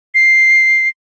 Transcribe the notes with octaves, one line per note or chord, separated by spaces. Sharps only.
C7